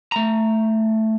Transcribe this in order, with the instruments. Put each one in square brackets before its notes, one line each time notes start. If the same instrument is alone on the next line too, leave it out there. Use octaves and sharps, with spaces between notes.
[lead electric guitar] A3 A#5